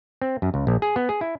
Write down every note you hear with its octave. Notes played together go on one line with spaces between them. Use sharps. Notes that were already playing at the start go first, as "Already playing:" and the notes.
C4
F#2
C#2
A#1
G#4
B3
G#4
E4